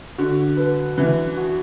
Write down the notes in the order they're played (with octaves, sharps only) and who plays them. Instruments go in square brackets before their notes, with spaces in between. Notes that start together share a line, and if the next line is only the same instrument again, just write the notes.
[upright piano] D3 [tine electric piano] F#4
[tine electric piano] B4
[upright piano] E3 [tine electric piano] B4
[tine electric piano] F#4